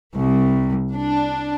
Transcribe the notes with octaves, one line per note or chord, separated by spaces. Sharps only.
C2
D4